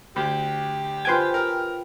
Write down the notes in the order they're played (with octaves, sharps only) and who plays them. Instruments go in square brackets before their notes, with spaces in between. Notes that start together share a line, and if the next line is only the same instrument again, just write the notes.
[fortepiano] D2 [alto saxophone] G4
[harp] F4 B4 G5 [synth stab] C5 G#5
[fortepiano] A#4